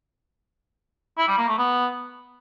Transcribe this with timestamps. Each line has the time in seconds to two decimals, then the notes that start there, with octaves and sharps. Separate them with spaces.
1.18 E4
1.28 G3
1.38 A#3
1.48 A3
1.58 B3